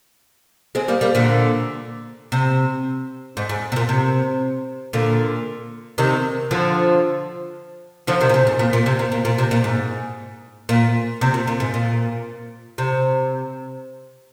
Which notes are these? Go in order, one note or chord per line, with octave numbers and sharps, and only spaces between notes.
G#3 C4
G3 A#3
G3 A#3
A#2 D3
C3
G#2
G#2
C3
A#2
C3
A#2 D3
C3 D#3
D3 F3
D3 F3
C3 D#3
A#2
C3
G#2
A#2
A#2
C3
A#2
A#2
A#2
C3
A#2
G#2
A#2
C3
A#2
A#2
G#2
A#2
C3